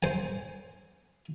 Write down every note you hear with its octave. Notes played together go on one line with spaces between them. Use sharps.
C5 G#5